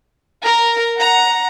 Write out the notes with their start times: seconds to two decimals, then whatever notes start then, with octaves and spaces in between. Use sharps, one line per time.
0.44 A#4
0.97 F#5 A#5